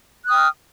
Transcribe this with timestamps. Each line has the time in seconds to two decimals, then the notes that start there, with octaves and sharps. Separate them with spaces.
0.25 F#6
0.28 D#6
0.32 G5
0.35 F6